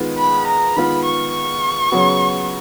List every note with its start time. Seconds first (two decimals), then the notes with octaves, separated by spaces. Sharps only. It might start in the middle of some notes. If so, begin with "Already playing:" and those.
Already playing: D#3 G#3 B3 F4
0.18 B5
0.47 A#5
0.76 D#3 G#3 B3 F4 B5
1.05 C#6
1.34 C#6
1.92 C#3 F#3 B3 F#4